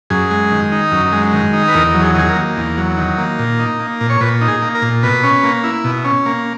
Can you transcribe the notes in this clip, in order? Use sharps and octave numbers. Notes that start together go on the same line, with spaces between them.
F#2 G#4
G#3
D#3
D#4
F#2
G#3
D#3
D#4
B4
E2 A#4
F#3
G#4
D#3 G#4
A#4
A#3
E2
F#3
D#3
A#3
A#2
D#4
A#3
A#2
C#5
A#2 B4
D#4
G#4
A#3
A#4
A#2
B2 B4
C#4
A#3
E4
B2
C#4
A#3